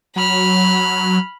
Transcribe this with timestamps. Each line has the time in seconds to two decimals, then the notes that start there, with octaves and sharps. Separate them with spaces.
0.16 F#3 B5 F6